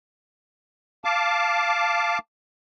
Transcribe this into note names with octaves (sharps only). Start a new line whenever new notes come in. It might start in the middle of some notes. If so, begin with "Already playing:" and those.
F5 A5 D6